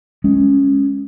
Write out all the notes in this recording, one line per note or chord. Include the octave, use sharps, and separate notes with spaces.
G#3 C#4